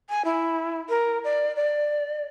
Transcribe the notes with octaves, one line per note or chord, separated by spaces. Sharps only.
G#5
E4
A#4
D5
D5